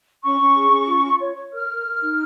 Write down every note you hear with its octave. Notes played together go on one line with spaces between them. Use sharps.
C#4 C#6
C#4
G#4
C#4
F4
F4
C#5
C#5
A#4 F6
A#4
A#4
D#4